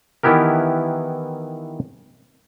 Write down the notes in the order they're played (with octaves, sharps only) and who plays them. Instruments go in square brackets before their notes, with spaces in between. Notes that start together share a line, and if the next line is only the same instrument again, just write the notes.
[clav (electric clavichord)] D#3 E3 B3 E4 G4 A#4